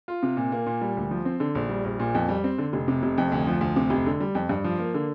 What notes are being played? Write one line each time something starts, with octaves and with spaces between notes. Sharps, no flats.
F4
C3
A#2
A#3
A#2
G3
D2
F3
C4
D3
A#1
G3
A#1
A#2
F2
G3
C4
D3
F1
C3
F1
F2
D2
F3
D2
C3
F1
D3
G3
F2
G2
F3
A#3
D3